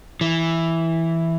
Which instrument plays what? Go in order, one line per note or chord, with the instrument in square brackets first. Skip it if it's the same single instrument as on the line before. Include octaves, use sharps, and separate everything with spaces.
[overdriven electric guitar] E3